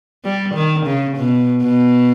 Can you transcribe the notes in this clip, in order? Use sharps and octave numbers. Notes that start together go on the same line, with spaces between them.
G3
D#3
C#3
B2
B2